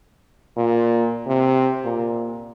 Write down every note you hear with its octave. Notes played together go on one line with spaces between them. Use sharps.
A#2
C3
A#2